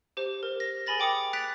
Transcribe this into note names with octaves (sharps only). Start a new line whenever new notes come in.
G4 C5
A#4
A#6
G#4 A#4 G#5 B5 A6 A#6
G5 D6 D#6 C#7
F#6 A6 B6 D7 F7